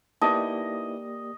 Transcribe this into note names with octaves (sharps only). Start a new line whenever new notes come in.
A#3 B3 D#4 E4 G4 D5 D#5 A5